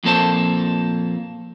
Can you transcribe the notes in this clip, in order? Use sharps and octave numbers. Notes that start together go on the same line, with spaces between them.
F2 A#2 A#3 A4 C5 A5